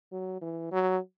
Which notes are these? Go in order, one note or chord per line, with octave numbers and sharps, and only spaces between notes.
F#3
E3
F#3